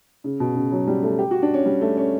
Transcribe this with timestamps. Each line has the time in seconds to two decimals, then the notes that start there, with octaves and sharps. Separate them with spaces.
0.24 C#3
0.40 B2
0.56 C#3
0.72 F#3
0.87 G3
1.03 A3
1.19 G4
1.31 F#4
1.42 D4
1.54 C#4
1.66 G3
1.81 A3
1.97 C#4